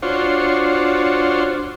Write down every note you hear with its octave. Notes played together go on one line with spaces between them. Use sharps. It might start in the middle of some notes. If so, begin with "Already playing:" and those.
D4 F4 F#4 C5 C#5